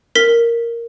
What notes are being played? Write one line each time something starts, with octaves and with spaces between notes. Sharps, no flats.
A#4 B6